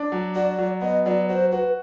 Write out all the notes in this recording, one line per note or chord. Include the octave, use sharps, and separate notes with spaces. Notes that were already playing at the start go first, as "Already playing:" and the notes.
Already playing: D4
F#3
F#4 D5
F#3
B3 D#5
F#3 D5
F#4 C5
F#4 B4